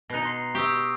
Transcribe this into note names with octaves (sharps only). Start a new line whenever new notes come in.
B2 D#4 F#6 A#6
A#5 C6 C7
G4 C#6 D#6 E6